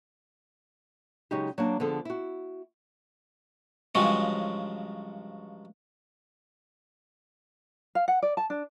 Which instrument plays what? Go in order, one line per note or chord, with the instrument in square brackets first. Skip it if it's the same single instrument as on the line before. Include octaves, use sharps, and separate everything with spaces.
[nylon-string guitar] C#3 F#3 G#3 D#4 F#4 G4
F#3 A#3 D4
D3 F3 B3 G#4 A4
E4 F#4
[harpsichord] G2 C#3 F3 F#3 G#3 F#4
[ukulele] F5
F#5
D5
A5
D4